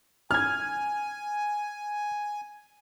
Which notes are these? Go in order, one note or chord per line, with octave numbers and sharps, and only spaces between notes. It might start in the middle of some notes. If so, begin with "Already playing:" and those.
G#5 F6 G#6